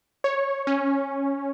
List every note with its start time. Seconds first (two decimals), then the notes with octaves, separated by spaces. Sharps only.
0.24 C#5
0.67 C#4